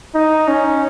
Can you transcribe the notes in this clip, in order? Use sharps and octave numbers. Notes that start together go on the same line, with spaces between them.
D#4
C#4